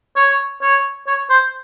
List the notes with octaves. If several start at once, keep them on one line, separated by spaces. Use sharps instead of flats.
C#5
C#5
C#5
C5